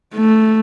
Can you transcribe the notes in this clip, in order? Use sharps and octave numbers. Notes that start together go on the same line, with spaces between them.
A3